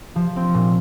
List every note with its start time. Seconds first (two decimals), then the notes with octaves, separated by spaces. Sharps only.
0.16 F3
0.36 C4
0.54 A#2